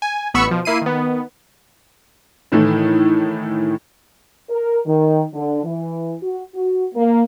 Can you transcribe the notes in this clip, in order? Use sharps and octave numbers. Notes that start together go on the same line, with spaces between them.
G#5
A1 B3 B5 C#6 E6 C#7
B2 F3
A#3 E4 C7 D#7
D#3 B3
A2 D#3 E3 A3
A#4
D#3
D3
E3
F#4
F#4
A#3